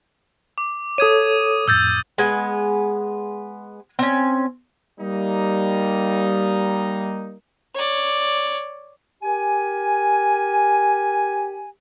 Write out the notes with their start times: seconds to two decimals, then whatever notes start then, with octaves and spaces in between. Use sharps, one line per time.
0.58 D6
0.98 A4 C#5 D#6 G#6 D#7
1.68 F2 A2 E6 G6 A6
2.18 G#3 B3 G#5
3.99 C4 C#4
5.00 G3 A#3 D#4
7.74 C#5 D5
9.23 G4 A#4 G#5